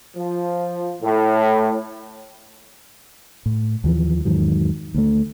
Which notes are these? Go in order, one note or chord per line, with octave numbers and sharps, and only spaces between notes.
F3
A2
A2
D#2 E3 F3
E2 G#2 D#3 F#3
D2 A3